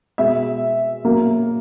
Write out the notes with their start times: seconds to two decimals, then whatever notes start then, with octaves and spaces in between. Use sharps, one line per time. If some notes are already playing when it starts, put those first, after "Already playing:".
0.18 B2 G#3 E5
1.05 B2 F#3 A#3